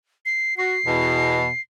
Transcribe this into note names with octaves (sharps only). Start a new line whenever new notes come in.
C7
F#4 C7
E2 B2